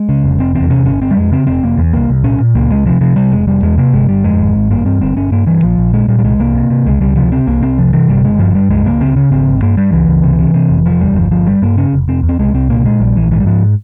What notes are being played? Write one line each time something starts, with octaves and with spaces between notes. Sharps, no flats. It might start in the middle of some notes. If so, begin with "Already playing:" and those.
Already playing: G#3
C#3
F1
F1 C4
E2 C4
C3 C#4
G1 C#4
G1 C4
G3
F2 G#3
C#3 C4
F1 C4
F1 A#3
E2
C2 A#3
C2
A#2 C#4
A#2
C#2 A#3
C#2 G#3
C3 F3
C3 F3
C3 G3
F1 G#3
F1 G3
E2 G#3
C3 A#3
G1 G#3
G1 G3
F2 G#3
G#1
G#1
G2 A#3
G2 C4
G1 C4
G1 C#4
G2 A#3
G2 E3
A#1 F3
A#1
A#2 G#3
A#2 G3
G3
C2 G#3
C2 A#3
C3
C3
C#2 G#3
C#2 G3
C3 F3
C3 C4
C2 A#3
C2 C4
C3 F3
C3 E3
G1 G3
G1 G#3
G2 F3
G2 G3
C#2 G#3
C#2 A#3
C#3 C4
C#3 C#4
G#1 C4
G#1
G2 A#3
G2 G3
C#2 E3
C#2
C3
C3
C3
F1
F1 F3
E2 G3
G1 F3
G1 F3
G2 G3
G2 A#3
C#3 C#4
F1
F1 C4
E2
C4
C2 G#3
C2 C4
A#2 A#3
A#2 G#3
A#1 G3
A#1 E3
G#2 E3
G3
G#2 F3